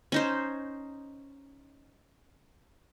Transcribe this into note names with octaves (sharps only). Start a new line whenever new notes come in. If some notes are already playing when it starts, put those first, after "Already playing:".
C#4 D#4 C5